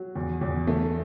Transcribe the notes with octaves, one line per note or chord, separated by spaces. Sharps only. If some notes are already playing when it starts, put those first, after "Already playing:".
Already playing: F#3
E2
E2
A3